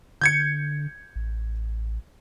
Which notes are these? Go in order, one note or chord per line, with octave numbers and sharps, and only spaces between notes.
D3 G6 G#6 C#7
A1